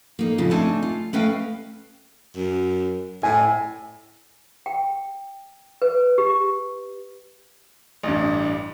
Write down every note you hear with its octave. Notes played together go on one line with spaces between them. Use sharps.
A#3 D#4
F2 G#2 C#3 F4
A3 C4 D4 D#4 G#5 A5
F4
A3 C#4 B4 D#5 F5 G5
F#2
A2 G#5
G5
B4
G4
A1 G2